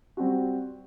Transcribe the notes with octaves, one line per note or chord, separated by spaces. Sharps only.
G3 C4 F#4